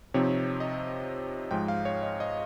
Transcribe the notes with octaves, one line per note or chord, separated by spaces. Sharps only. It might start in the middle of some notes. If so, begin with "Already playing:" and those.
C3 F3 C4 D#4 C#5
D#5
G#2 F3 G#3 G5
F5
C#5
D#5
D#5